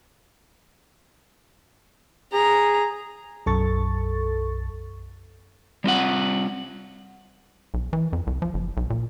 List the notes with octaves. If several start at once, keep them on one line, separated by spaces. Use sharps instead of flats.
G#4 A#5
B1 F#2 A4 C#6 A6
G3 C4 F4 F#5
B1
E3
F2
C2
F3
F#1
B1
A#2